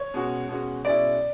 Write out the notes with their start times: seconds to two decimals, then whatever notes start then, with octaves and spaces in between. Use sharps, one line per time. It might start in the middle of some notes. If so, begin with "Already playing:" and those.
Already playing: C#5
0.14 B2 G#3 C#4 F#4
0.49 B2 G#3 C#4 F#4
0.85 B2 G#3 C#4 E4 D5